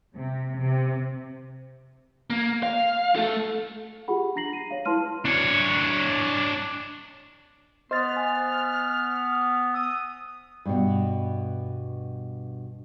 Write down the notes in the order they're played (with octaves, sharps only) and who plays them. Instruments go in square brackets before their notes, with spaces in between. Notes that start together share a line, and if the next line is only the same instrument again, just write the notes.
[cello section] C3
C3
[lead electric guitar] A#3
F5
A3 A4
[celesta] F4 G4 G#4 F#5 B5
D4 A#5 A#6 C7 F#7
D#7
C#5 F5
E4 B4 A5 C6 F6 D#7
[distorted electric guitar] D4 C#5
[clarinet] B3 [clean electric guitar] C5 [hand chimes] D#5 A6 [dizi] F6
[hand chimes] G#5
[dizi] D#6 [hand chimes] E6
[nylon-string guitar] G2 B2